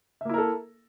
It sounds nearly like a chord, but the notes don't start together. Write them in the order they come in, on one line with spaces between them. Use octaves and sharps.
E5 A#3 E4 A#4 A4